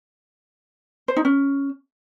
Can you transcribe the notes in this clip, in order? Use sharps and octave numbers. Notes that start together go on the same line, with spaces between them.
C5
D#4
C#4